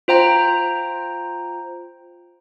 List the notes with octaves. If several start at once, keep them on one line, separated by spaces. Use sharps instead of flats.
F4 C5 G5 A#5